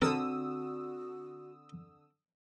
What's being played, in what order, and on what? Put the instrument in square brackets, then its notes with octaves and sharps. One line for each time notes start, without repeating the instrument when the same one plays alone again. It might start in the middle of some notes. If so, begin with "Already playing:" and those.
[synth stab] D3 D#6 E6 [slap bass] C4 [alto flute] F#4 [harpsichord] A4 A#4